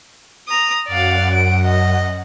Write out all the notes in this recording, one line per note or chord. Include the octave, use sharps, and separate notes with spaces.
A#5 D#6
F#2 D5 F5 F#5
D7
D#5